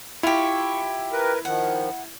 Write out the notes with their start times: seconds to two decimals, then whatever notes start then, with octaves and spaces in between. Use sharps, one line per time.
0.23 E4 F4 G4 C#6
1.12 A#4 B4
1.45 D#3 F3 F#5